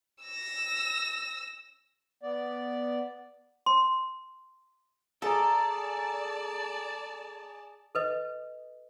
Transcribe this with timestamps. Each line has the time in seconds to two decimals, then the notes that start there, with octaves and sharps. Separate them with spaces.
0.24 E6 A#6
2.23 B3 D5
3.66 C6
5.22 G#4 A4 D5 A5 A#5
7.95 A4 B4 D#5